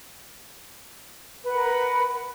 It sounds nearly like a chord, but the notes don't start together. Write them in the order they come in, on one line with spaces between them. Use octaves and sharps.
B4 F#5 A#4 B5